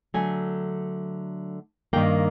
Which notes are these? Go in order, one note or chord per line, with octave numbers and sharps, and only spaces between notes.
D3 F#3 A3 G#5
G2 D#3 G3 A#3 G5